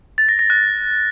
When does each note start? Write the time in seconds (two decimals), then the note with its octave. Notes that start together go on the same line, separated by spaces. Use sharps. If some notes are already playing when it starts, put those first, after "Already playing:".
0.18 A6
0.29 A#6
0.39 A#6
0.50 F#6